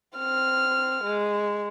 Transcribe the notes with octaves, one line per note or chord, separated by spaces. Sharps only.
C4 F6
G#3